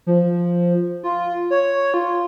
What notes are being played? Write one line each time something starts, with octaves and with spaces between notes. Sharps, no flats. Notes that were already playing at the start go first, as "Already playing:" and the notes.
F3
F4
C#5
F4